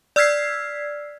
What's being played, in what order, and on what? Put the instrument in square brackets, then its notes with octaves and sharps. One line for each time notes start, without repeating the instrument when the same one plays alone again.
[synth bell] D5 E6 F6 G#6 B6 C7